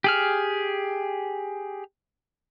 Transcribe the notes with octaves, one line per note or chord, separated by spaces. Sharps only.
G4 G#4 F6